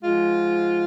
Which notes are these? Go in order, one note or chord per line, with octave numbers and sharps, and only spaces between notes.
G#2 F3 G#3 F4